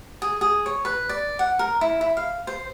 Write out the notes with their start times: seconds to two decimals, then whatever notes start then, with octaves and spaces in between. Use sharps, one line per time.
0.22 G#4
0.41 G#4
0.66 C#5
0.85 B4
1.09 D5
1.39 F#5
1.59 A#4
1.81 E4
2.01 E4
2.17 F5
2.47 C5